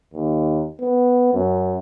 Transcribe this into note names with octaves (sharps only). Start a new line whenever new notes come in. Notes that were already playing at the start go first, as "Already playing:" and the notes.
D#2
B3
F#2